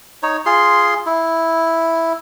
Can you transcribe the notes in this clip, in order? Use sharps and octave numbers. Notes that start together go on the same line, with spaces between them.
D#4 C#5
F4 G#4 C6
E4